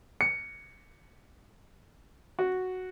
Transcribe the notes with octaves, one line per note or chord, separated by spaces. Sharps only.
C#7
F#4